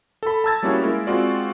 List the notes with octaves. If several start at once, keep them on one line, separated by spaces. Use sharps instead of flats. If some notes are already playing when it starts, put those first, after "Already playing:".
A4 B5
A5 A#5 E6 G#6 A6
G3 A#3 C#4 E4 F#4 G#4
G#3 A#3 E4 A#4
G#3 C4 F4 F#4 D5